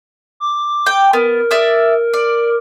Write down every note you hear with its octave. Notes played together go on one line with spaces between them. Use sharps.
D6
G5
B3 A#4
D5 E5 D#6
D5